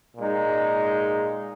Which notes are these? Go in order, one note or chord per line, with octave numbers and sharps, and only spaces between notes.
A#2 G#3 D#4